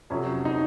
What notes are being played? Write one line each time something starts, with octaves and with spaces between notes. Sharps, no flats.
F2 C3 F#3 C#4
D#4